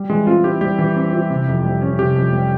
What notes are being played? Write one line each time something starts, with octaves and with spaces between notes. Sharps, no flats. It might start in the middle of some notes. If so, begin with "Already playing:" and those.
Already playing: G3
E3 G#3
C4 F4
E4 G4
G3 G4
E3
C4
E4
C3
F2
G3
C#4
C3 G4
F2
G3